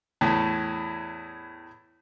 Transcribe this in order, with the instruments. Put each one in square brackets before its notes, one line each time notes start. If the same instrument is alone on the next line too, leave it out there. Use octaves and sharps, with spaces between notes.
[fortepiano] E2 A2